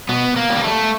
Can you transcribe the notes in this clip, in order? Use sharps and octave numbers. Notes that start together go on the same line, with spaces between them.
B2 B3
A#3
G3
A#3
A3